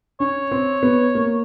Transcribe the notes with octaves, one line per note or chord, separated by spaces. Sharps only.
C#4 C#5
C4
B3
A#3